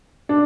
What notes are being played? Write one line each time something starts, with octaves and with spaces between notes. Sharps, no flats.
D4